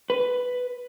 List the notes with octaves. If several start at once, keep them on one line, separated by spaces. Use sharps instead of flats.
B4